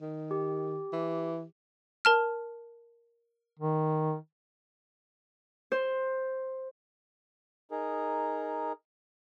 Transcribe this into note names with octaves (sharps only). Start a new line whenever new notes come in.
D#3
G4
E3
A#4 A5 F6
D#3
C5
D#4 G#4 A#4